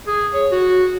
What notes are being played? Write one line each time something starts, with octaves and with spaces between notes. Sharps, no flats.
G#4
C#5
F#4